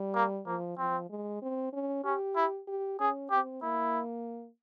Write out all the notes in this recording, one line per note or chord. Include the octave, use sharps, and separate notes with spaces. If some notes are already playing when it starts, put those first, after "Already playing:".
Already playing: G3
A#3
F3 A#3
F3 C4
G#3
C4
C#4
C#4 G4
E4
G4
C#4 G#4
C4 G4
A#3 E4